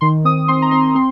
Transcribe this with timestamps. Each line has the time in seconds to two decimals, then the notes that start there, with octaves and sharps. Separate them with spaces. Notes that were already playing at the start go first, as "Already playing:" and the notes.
0.01 D#3 C6
0.25 C4 D#6
0.48 C4 C6
0.62 A#5
0.71 C4 C6
0.95 C4 C6